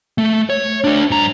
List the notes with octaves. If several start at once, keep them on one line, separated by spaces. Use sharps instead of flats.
A3
C#5
A3 D4
G2 A#5